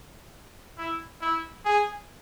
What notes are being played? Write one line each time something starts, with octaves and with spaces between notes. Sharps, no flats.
E4
E4
G#4